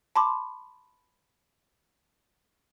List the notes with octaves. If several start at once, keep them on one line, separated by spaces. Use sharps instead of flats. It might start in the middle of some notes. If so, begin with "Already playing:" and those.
A5 B5 C6 D6